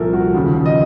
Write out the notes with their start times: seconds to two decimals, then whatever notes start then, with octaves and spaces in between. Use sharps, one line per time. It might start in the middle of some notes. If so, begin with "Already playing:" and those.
Already playing: C2 A#2 F3 A4 A#4
0.13 F#4
0.34 D#2 C#3 F3
0.66 D#5